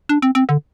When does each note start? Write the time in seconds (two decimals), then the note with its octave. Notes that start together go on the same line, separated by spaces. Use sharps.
0.09 D4
0.22 C4
0.35 C4
0.49 D3